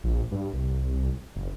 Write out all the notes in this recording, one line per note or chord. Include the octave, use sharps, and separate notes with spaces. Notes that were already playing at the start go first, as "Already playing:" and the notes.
A#1
G2
C2
F#1